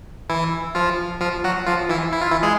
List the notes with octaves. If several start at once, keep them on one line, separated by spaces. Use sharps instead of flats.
E3 E4
F3 F4
F3 F4
F#3 F#4
F3 F4
E3 E4
E4
F4
E3 E4
G#3 G#4